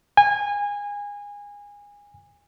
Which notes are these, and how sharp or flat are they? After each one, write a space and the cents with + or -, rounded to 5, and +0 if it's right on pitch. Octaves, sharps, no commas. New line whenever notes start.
G#5 -25